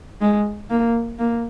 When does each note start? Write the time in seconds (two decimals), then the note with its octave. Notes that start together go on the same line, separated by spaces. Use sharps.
0.21 G#3
0.70 A#3
1.19 A#3